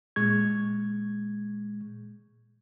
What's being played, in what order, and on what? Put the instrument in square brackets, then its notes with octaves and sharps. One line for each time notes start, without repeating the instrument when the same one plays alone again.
[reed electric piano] A#2 G#3 C#6 G#6